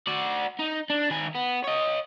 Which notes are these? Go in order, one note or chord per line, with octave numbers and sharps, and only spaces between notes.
F#4 D5
D#4
D4
D#3 G#5
B3
C#5 D#5